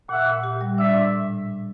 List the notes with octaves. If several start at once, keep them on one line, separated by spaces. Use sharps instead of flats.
A#2 E5 F#5
A#2
G4
G3
D4 D5 E5
A2